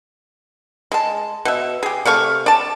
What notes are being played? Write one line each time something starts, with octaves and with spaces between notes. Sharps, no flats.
G#3 A5
B2 E5
G4 G#4
C3 A3 F5 C#6
D5 A5